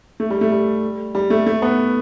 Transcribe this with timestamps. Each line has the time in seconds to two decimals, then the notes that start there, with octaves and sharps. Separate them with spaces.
0.20 A3
0.30 G3
0.41 A3
0.52 G3
1.15 G3
1.30 A3
1.46 A3
1.62 B3